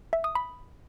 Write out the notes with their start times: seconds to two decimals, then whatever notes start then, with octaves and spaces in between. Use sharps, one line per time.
0.13 E5
0.24 D#6
0.35 B5